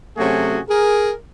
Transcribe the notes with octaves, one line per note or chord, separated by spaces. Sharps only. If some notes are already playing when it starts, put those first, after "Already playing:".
C3 F#3 A3 C#4 F#4 G#4
G#4 A#4